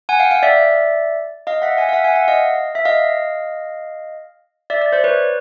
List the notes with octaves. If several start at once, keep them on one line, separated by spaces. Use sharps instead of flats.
F#5 G#5
F5 G5
F5 G5
D5 E5
D#5 F5
E5 F#5
F#5 G#5
F5
E5 F#5
F#5 G#5
E5 F#5
D#5 F5
E5
D#5 F5
D5 E5
D5 E5
C5 D5
B4 C#5